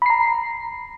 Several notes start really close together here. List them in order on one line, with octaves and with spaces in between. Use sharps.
B5 C7 A#5